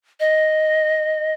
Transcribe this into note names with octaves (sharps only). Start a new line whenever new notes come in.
D#5